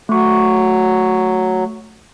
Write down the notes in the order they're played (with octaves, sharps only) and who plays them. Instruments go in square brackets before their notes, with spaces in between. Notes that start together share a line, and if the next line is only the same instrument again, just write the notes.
[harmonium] F#3 [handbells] A3 C#6